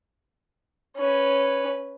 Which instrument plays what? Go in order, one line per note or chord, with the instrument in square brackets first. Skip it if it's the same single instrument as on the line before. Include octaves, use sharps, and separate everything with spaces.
[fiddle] C#4 B4